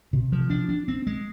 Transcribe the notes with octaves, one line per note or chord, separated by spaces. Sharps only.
C3
F3
D4
D4
C4
G#3